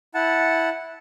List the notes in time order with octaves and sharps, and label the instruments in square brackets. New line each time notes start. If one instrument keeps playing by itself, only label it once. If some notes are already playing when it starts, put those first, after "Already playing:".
[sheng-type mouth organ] E4 F#5 A5